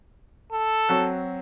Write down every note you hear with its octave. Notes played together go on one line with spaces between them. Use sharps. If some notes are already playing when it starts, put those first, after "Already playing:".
A4
F#3 C4 F#4